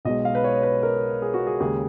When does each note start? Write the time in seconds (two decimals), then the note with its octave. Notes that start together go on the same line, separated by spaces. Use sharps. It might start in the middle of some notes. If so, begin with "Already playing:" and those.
0.05 B1 B2 G#3 D#5
0.25 F5
0.35 B4
0.44 C#5
0.63 B4
0.83 A#4
1.22 G#4
1.34 F#4
1.47 G#4
1.60 D#2 C#3 G#3 G#4